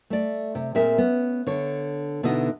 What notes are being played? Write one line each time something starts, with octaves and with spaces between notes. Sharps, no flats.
A3 D5
C3
A#2 C4 G#4 A#4 E5
B3 C#4
D3 C#5
B2 D3 B3 D#4 E4 D#5